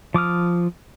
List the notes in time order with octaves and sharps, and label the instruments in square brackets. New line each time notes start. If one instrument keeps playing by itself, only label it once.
[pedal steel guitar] F3 D6 D#6 F6